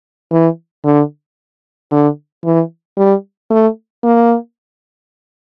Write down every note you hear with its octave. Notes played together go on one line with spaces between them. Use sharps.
E3
D3
D3
E3
G3
A3
A#3